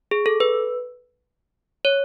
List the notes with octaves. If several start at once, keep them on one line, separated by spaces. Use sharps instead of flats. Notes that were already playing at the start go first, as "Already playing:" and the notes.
G#4
A4
B4
C#5